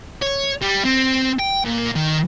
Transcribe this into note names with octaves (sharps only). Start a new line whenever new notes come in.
C#5
G3
C4
G5
A#2
D#3